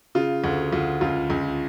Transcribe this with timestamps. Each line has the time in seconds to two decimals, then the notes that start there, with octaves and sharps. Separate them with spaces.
0.15 C#3 F4
0.44 D2 F#4
0.72 D2 F4
1.01 C#2 F4
1.30 C#2